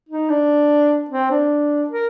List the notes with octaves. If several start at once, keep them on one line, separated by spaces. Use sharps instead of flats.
D#4
D4
C4
D4
A#4